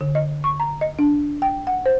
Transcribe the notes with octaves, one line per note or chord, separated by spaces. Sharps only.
D3
D#5
C#6
A#5
D#5
D4
G5
F#5
C5